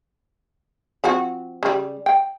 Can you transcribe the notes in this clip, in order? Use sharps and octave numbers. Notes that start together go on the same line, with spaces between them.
F3 C4 F#4
C#3 G3
G5